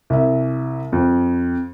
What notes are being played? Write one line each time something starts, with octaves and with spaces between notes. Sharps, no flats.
C2 E5
F2